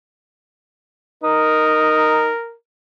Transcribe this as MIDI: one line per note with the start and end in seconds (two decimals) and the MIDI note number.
1.23 2.31 63
1.23 2.56 70